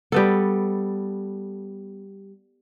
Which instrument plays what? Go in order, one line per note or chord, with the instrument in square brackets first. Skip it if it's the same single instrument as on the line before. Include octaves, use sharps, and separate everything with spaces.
[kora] G3 B3 A4